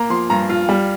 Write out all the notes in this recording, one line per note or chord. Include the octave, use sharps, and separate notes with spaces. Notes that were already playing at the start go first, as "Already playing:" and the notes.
Already playing: A#3 A#5
F3 C6
G2 A#5
F4
G3